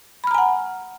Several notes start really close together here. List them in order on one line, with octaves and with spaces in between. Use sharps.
B5 F6 A#5 G#5 F#5